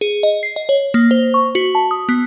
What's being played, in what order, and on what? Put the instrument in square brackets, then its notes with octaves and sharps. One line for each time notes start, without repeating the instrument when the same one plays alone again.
[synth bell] G#4
D#5
C7
D#5
C#5
A#3
C5
C#6
F#4
A5
D#6
B3